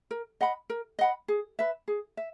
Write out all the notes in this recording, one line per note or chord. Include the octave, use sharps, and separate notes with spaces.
A#4
D#5 F#5 B5
A#4
D#5 F#5 B5
G#4
B4 E5
G#4
E5